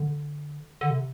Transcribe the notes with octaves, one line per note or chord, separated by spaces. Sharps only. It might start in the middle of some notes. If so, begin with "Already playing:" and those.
Already playing: D3
D3
C3